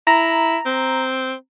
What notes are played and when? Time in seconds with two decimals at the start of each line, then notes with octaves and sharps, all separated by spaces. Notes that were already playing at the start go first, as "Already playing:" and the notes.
0.07 E4 A#5
0.66 C4